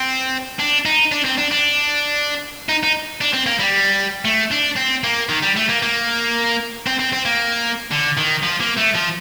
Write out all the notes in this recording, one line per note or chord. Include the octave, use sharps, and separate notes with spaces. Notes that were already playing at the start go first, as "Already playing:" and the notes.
Already playing: C4
D4
D#4
D4
C4
D4
D4
D#4
D#4
D4
C4
A#3
G3
A3
D4
C4
A#3
D#3
G3
A3
A#3
A#3
C4
C4
C4
A#3
D3
D#3
F3
A#3
A3
F3